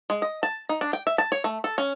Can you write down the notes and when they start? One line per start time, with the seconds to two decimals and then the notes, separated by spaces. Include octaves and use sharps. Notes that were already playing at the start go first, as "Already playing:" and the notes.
0.10 G#3
0.22 D#5
0.43 A5
0.69 D#4
0.81 D4
0.93 G5
1.07 E5
1.18 A5
1.32 C#5
1.44 A3
1.64 A4
1.78 C#4